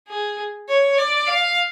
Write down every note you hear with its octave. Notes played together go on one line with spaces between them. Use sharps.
G#4
C#5
D5
F5